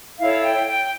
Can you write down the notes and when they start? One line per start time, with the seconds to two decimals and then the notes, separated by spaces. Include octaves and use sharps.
0.20 E4 A4 C#5 F5
0.44 G5
0.67 G5